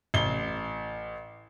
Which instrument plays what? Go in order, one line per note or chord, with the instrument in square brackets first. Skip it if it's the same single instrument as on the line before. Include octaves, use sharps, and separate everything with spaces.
[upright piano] A1 G7